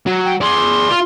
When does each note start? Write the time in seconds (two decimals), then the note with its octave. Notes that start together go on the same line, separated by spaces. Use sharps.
0.07 F#3
0.25 G5
0.41 G#4 D5 C6
0.91 F4